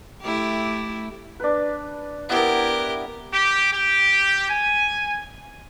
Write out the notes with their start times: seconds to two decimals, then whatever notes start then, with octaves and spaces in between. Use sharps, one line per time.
0.22 A3 E4 G4
1.40 D4 B4
2.29 B3 E4 G4 A#4
3.33 G4
3.72 G4
4.50 G#5